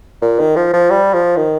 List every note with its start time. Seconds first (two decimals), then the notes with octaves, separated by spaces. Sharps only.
0.22 A#2
0.39 D#3
0.56 F3
0.73 F3
0.90 G3
1.14 F3
1.36 D#3